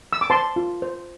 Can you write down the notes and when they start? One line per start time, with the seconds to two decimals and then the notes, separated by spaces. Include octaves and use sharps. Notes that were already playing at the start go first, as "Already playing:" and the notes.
0.13 E6
0.21 D6
0.30 C5 A5 C6
0.56 F4
0.82 C5